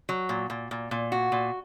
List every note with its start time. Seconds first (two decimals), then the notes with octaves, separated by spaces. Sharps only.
0.09 F#3
0.29 A#2
0.50 A#2
0.71 A#2
0.91 A#2
1.12 F#4
1.32 A#2